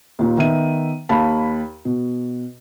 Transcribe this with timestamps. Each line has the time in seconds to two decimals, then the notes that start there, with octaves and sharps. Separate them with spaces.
0.19 D#2 A#2
0.37 D#3 B3 E5 D#7
1.09 D#2 F5 A5 B5
1.85 B2